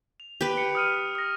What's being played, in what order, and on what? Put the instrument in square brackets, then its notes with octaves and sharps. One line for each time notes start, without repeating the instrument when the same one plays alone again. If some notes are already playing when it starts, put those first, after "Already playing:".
[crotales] F7
[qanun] G4 B4
[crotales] C#7
D#6 F6 D#7
D#6 A#6